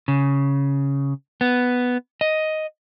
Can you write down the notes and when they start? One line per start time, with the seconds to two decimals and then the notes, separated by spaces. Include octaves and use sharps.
0.08 C#3
1.41 B3
2.21 D#5